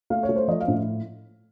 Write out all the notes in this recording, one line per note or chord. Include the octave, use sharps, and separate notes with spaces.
A3 F5
C#5
A3
C5
F3 D#5
F5
A2